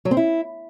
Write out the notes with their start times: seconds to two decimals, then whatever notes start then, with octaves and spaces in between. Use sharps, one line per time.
0.05 F#3
0.11 C4
0.17 E4